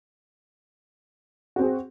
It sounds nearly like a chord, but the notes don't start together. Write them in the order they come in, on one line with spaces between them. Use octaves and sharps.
F#4 C4 G#4